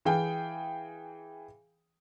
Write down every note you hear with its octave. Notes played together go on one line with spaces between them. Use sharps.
E3 G#4 F5 G5